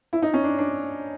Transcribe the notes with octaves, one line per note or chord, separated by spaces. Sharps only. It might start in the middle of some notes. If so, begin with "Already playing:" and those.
E4
D#4
C#4
D4
D4